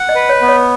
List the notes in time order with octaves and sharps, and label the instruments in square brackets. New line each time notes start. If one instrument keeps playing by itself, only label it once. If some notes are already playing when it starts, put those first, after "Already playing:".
Already playing: [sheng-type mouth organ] F#5
[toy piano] D#5
[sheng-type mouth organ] B4
[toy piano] C#5
[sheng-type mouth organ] B3
[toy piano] C#5